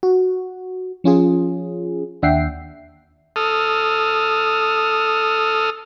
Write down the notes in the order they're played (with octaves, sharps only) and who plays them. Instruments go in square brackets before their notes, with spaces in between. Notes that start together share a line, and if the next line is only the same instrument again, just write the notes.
[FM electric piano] F#4
F3 C#4 F4 G#4
D#2 D4 E5 F#5 G5 C7
[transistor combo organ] A4 D#6 F6